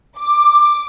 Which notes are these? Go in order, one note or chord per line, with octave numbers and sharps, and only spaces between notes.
D6